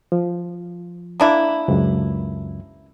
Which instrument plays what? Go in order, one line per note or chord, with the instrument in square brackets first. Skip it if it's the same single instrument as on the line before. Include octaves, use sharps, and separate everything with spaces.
[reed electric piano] F3
[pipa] A#3 D4 E4
[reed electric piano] C#2 F#2